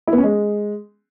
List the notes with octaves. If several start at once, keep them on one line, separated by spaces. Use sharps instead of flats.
E4
B3
C#4
G#3